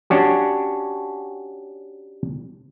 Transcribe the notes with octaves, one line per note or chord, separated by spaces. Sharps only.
C#4 D4 F#4 G4